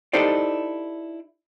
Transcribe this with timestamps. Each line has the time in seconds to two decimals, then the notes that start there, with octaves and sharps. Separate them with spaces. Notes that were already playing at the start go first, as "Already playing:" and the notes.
0.13 D#4 E4 G4 A4 C5 D5